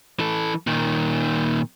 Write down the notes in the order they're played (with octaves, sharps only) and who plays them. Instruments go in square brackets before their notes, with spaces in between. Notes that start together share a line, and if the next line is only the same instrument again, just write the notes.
[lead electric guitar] E3 A4
A#2 D#3